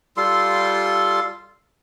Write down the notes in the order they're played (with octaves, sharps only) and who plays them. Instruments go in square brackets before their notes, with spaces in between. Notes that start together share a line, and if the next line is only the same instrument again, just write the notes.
[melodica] G3 F4 A4 C6